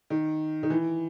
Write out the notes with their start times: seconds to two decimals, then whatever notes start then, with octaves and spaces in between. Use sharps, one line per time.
0.10 D#3
0.63 D#3
0.70 E3